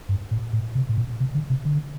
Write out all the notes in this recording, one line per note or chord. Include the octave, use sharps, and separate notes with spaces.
G2
A2
A2
C3
A2
A#2
C3
D3
C3
D3